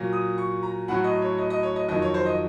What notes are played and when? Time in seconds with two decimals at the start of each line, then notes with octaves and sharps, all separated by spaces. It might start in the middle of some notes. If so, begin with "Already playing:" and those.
Already playing: A#2 F#3
0.13 D#6
0.38 C#6
0.63 A#5
0.88 A2 F#3 F#5
1.04 D#5
1.22 C#5
1.38 D#5
1.50 D#5
1.63 C#5
1.76 D#5
1.88 F2 D#3 F#3 D#5
2.02 C#5
2.14 C5
2.26 D#5